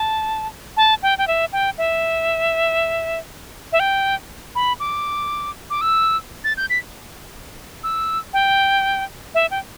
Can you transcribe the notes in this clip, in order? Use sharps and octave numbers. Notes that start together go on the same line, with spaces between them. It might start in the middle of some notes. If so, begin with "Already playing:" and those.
Already playing: A5
A5
G5
G5
E5
G5
E5
E5
G5
B5
D6
D6
E6
A6
G6
B6
E6
G5
E5
G5